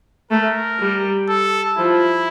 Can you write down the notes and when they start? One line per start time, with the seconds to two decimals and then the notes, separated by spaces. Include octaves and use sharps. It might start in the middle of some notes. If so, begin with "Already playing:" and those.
0.31 A3 A#4
0.79 G3
1.28 A4
1.77 F3 E4